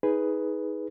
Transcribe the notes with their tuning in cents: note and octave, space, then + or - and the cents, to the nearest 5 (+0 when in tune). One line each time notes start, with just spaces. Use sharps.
D#4 +25 G#4 +0 B4 +5